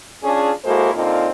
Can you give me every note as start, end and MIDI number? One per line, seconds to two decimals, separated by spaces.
0.23 0.50 61
0.23 0.50 62
0.23 0.50 65
0.23 0.50 68
0.65 0.93 56
0.65 0.93 58
0.65 0.93 64
0.65 0.93 66
0.65 0.93 69
0.65 0.93 72
0.94 1.29 46
0.94 1.29 50
0.94 1.29 60
0.94 1.29 63
0.94 1.29 65